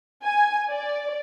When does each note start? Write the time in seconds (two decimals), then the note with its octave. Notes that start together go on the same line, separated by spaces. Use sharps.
0.24 G#5
0.70 D5